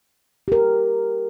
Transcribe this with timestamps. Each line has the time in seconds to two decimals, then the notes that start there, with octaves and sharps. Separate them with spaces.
0.48 G4 A#4